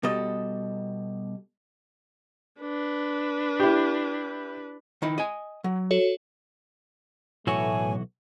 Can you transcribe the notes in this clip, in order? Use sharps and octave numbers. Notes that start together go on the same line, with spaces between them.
B2 G3 A4 D#5
D4 B4
E4 G4
D#3 D#4 E4
D#5 G#5
F#3
F#4 A4 C#5
B1 A2 E3 A3 F#4 C#5 G#5